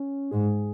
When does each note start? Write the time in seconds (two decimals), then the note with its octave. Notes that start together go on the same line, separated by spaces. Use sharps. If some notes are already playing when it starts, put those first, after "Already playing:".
Already playing: C#4
0.31 G#2 G#4